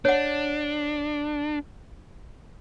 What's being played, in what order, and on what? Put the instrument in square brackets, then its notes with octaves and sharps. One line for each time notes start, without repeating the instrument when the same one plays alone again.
[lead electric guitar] D4 [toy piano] C#5 F#5